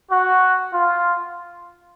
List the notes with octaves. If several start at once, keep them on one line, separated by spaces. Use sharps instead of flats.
F#4
F4